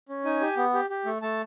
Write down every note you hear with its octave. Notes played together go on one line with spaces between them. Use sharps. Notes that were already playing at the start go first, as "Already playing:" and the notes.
C#4
D#4 G#5
G4
B3
G4
G4
A3
A3 A5